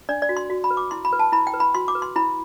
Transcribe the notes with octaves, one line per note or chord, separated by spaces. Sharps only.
D4 D5
D5
F#4
C6
F#4
B5
B4
D6
E4 C6
B5
B4
A5
E4 B5
G5
B4
B5
F#4 C6
D6
B4
C6
E4 B5